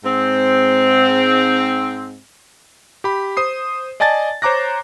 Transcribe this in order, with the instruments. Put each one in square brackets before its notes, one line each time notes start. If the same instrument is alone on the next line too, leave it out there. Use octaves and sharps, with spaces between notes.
[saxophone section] G#2 C4
[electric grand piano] G4 B5
C5 D#6 C7
D5 D#5 G#5 A5 A6
C5 C#5 A#5 D6 F#6 A#6